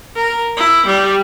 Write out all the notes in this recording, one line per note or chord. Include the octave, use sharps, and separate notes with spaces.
A#4
E4
G3